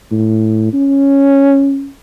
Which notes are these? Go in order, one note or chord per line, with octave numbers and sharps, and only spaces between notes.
A2
C#4